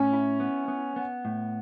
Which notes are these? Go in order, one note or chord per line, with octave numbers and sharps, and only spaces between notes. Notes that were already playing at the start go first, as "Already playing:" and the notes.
Already playing: A2 C#4
E4
B3
B3
B3
A2